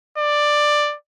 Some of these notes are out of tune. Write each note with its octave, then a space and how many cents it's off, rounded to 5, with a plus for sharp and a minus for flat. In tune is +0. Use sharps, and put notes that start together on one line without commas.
D5 +10